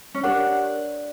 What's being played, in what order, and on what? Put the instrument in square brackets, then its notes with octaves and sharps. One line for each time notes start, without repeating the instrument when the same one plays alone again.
[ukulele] C#4
[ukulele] D4 [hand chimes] G4 A#4 C#5 F#5